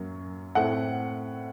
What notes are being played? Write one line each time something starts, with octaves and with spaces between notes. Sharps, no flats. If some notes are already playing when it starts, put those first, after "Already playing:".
Already playing: F#2 F#3 A#3
A2 A3 C4 F#5